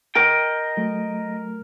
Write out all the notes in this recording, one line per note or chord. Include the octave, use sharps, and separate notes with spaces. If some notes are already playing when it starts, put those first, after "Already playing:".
A#4 D#5 G5
F#3 A3